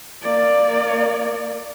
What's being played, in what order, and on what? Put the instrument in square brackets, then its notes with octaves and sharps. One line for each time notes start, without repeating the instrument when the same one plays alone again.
[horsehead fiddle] A#3 D5